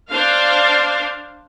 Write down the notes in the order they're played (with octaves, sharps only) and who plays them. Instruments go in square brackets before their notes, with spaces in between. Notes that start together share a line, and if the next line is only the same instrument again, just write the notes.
[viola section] D4 C5 F5